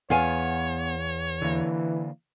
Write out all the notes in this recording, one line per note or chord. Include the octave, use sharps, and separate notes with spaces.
E2 B3 C#5 F5 G#5
D3 E3 A#3